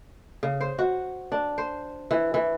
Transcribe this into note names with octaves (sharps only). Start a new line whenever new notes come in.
C#3
C5
F#4
D4
C5
E3
E3